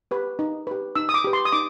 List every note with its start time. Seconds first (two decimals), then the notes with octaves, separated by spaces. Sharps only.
0.11 G4 B4
0.39 D#4
0.67 G4 B4
0.96 D#4 E6
1.09 D#6
1.14 D6
1.24 G4 B4
1.33 C6
1.45 D#6
1.52 D#4 D6